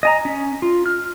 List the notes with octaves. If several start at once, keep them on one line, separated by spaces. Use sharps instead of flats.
D#5 G#5 A#5
C#4
F4
F6